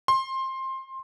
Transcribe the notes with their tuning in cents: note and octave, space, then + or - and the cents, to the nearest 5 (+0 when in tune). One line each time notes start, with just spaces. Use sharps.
C6 +20